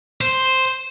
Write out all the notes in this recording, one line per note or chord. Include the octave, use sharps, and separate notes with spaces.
C5